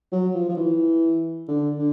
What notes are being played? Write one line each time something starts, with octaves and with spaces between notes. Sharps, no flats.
F#3
F3
F3
E3
D3
D3